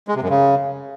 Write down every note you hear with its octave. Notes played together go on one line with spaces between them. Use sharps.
G#3
C3
F#2
C#3